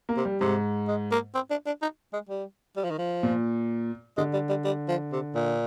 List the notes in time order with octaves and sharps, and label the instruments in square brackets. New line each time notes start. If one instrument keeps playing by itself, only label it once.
[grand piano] A#3
[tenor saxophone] C3
[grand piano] G3
[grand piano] G#2 [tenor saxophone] C3
[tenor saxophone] G#3
A#3
C4
D4
D4
D#4
G#3
G3
G3
F3
D#3
F3
[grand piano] A#2
[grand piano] D3 [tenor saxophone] G#3
[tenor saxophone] G3
G3
G3
F3
C3
A#2